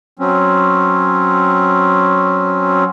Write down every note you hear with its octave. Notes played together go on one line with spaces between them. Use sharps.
F#3 C4 C#4